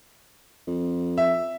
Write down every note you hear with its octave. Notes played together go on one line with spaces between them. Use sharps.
F2
E5